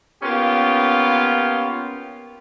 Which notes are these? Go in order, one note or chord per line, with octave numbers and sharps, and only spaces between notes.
A#3 B3 C#4 F4 G4